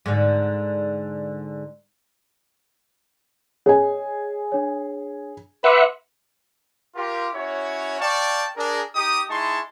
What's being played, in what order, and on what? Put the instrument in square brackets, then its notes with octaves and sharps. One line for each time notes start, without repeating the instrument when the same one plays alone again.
[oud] G#2 D3
[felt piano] G#4 G#5 [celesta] C#5 D#5
[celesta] D4 C#5
[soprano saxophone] B4 [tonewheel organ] E5 F#5 [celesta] C6 D6
[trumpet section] F4 G4 A#4
C#4 E4 F#4 C#5
D5 F5 G5 A5 C#6
D4 G#4 A#4
D#4 G4 D#6
G#3 D#4 E4 A5 C6 C#6